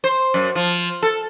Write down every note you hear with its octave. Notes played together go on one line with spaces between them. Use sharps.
C5
F#2
F3
A4